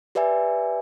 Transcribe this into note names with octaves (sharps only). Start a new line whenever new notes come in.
G4 B4 D5 E5 G#5